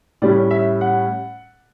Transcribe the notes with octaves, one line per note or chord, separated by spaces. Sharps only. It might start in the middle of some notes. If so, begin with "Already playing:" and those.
A2 G3 C#4 D5
E5
F#5